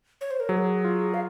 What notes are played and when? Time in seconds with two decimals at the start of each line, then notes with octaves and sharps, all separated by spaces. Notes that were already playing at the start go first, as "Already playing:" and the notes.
0.21 C#5
0.30 C5
0.40 A#4
0.49 F#3 G#4
0.84 F4
1.14 F5